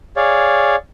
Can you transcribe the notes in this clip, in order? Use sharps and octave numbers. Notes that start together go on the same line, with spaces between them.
G#4 C#5 D5 F5